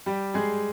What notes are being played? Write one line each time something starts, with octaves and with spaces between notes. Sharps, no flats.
G3 G4
G#3 G#4